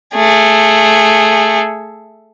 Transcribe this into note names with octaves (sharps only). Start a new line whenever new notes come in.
A3 G#4